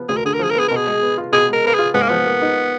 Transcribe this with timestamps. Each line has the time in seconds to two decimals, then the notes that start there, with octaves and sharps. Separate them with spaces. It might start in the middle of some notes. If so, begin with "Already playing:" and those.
Already playing: F3 B3
0.09 D2 G#4
0.17 A#4
0.25 D3 G#4
0.34 A#4
0.39 F3 G#4
0.51 A#4
0.55 B3 G#4
0.68 B2 A#4
0.77 G#4
0.87 G#3
1.02 B3
1.18 F4
1.32 B2 G#4
1.49 G#3 A#4
1.64 B3 A#4
1.74 F4 G#4
1.94 G#2 B3
2.02 A#3
2.09 F3 B3
2.26 A#3
2.42 D#4